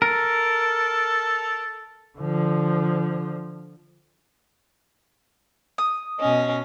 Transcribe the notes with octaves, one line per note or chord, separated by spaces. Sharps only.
A4 A#4
D3 F3
D#6
B2 C#4 D#5